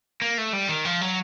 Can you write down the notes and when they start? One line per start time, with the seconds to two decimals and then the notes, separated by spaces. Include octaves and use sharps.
0.22 A#3
0.38 A3
0.53 G3
0.69 D#3
0.85 F3
1.01 F#3